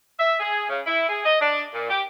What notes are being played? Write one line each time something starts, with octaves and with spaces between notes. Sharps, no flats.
E5
G#4
C#3
E4
G#4
D#5
D4
A#2
G4